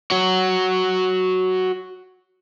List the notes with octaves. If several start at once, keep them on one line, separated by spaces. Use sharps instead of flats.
F#4 C#5